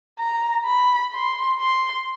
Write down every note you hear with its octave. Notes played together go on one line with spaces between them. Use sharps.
A#5
B5
C6
C6